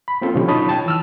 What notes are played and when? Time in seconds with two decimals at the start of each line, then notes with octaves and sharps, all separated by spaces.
0.08 B5
0.22 A#3 C4 C#4 F4 A4
0.35 B2 D3 F3 F#3 C#4 G4
0.48 D#4 F4 C#5 A5 B5 D#6
0.69 G5 A5
0.86 E3 E6 F6